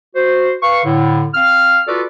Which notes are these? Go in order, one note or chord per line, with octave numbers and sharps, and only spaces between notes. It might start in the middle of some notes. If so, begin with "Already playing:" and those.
F#4 C5
B4 F5 C#6
A2 D3
C4 F5 F6
F4 F#4 A4 B4 D5